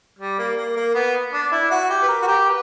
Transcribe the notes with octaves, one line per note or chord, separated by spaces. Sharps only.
G3
A#3
A#3
A#3
B3
D4
E4
F#4
G4
B4
A#4
F#4
G4
B4